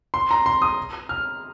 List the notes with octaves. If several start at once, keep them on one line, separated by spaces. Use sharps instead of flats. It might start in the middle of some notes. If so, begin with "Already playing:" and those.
C6
A#5
C6
D#6
F6